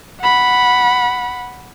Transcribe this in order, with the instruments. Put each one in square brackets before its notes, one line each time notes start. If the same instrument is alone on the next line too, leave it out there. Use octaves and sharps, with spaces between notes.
[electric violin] F#5 B5